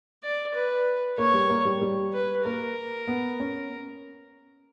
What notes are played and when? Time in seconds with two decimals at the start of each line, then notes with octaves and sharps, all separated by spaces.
0.23 D5
0.55 B4
1.18 A#3 C#5
1.34 G3
1.50 A#3
1.65 G3
1.82 G3
2.13 B4
2.45 A#3 A#4
3.08 B3
3.40 C#4